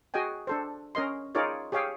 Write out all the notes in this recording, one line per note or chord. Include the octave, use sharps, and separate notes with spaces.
F#4 G#4 D#5 G5 G#5
D4 A4 C5
C#4 A#4 D#5 C6
D#4 F4 G#4 A#4 C#5 D5
G4 G#4 C#5 F5 G5